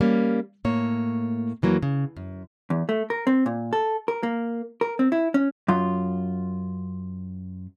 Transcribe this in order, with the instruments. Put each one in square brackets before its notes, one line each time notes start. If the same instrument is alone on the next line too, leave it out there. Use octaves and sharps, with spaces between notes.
[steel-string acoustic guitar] G3 A#3 C#4
A2 A#3 C#5
F2 E3 F#3 A#3
C#3
F#2
[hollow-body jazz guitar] E2
A3
A#4
C4
A#2
A4
A#4
A#3
A#4
C4
E4
C#4
F#2 F4